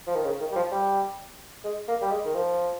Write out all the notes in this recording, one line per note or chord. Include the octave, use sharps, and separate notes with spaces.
F3
D#3
C#3
D#3
G3
F3
G3
G#3
A#3
G3
G#3
D#3
F3